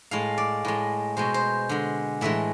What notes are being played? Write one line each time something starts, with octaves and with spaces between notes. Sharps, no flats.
A2 G#3 F5
D5
A2 G#3
B2 G#3 C5
C5
D3 G#3
A2 E3 G#3 E5